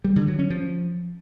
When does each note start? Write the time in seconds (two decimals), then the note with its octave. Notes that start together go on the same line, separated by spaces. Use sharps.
0.04 G3
0.16 D3
0.27 F#3
0.39 C#4
0.50 F3